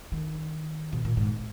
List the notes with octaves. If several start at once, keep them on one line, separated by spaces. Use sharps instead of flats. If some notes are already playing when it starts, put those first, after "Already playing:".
D#3
B2
A#2
G#2